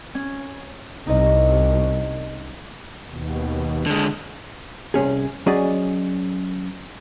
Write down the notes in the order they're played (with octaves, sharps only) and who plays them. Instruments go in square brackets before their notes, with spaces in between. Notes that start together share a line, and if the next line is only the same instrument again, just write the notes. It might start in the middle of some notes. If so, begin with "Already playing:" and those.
[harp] C#4
[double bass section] C2 [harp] D#4 D#5
[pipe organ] D#2 B2
[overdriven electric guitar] D3 G#3
[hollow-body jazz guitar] C2 F2 C#4 G#4
F#3 C#4 G#4 D5 D#5